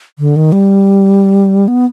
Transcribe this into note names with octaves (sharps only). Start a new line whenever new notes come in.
D3
D#3
G3
B3